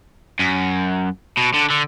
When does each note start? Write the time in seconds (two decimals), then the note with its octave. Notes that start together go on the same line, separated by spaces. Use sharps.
0.40 F#2
1.38 B2
1.54 D3
1.70 D3